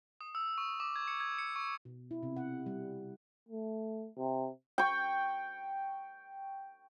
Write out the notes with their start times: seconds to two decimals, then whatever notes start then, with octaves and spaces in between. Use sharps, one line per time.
0.21 D#6
0.35 E6
0.58 C#6
0.80 D6
0.96 G#6
1.08 C#7
1.20 G#6
1.38 C#7
1.56 C#6
1.85 B2
2.11 E4
2.23 C3
2.36 F#5
2.66 G3
3.49 A3
4.17 C3
4.78 G5 C#6